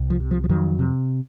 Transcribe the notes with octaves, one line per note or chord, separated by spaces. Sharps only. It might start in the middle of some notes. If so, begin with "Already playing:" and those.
Already playing: C2
F3
C3
F3
F3
F2 D#3 F#3
C3